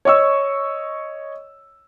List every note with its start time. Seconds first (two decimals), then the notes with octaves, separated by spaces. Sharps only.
0.05 C#5 D#5 C#6 E6